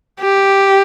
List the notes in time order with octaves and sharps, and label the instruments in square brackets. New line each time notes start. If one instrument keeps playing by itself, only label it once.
[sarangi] G4